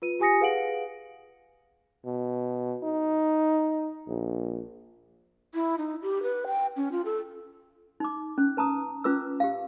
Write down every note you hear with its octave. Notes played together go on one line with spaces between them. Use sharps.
F4 B4 D#7
F4 G4 G#5 D#6 A#6 C#7
G#4 B4 F5 F#5 D7 F#7
B2
D#4
A#1
E4
D#4
G4
B4
G5
C#4
F4
A4
D#4 D6
C#4
B4 A5 A#5 D#6
C#4 F4 B4 D6 E6
G4 F5